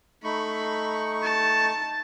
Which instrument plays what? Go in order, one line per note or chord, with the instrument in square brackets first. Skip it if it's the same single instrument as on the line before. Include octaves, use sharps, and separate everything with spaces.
[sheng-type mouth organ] A3 D#4 C#6 [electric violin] B5
[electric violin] A5